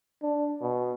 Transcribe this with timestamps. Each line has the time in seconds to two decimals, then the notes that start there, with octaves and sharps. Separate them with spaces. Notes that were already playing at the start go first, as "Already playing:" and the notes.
0.22 D4
0.61 B2